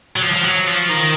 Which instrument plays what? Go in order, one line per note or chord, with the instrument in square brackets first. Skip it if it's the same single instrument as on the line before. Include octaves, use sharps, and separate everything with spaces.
[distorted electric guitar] F#3
F3
F3
F#3
F3
D#3